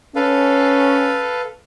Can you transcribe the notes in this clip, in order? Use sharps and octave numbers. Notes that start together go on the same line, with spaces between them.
C#4 A4 B4 F5